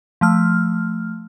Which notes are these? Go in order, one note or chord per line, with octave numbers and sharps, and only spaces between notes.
F3 A3 F6